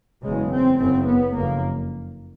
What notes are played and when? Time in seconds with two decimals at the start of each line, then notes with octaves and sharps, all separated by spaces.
0.23 F#1 E2 C#3 G#3
0.52 C4
0.80 F#1 F#2 C#3 C4
1.08 B3
1.36 F#1 F2 A#3